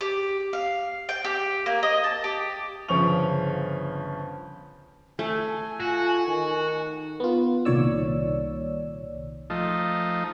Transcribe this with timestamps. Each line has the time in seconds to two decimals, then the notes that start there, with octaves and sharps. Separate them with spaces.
0.01 G4
0.53 F5
1.09 G5
1.25 G4
1.66 A#3
1.83 D#5
2.04 A5
2.24 G4
2.89 G1 C#3 F3 C#4 C#6 F7
5.19 A3 G#5
5.80 F4 F#4
6.28 D#3
7.20 B3 F4
7.65 C2 A#2 D#3 C#5 D5 E6
9.50 F3 A3 D#4